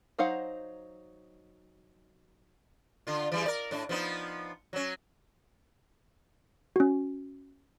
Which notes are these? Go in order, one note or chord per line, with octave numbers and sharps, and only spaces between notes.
F#3 D#4 C5 F5 F#5
D3 F4
E3 G3 G#4
A#4 D5
A2 D4
F3 B3 D#4
F#3 C#4
C#4 F#4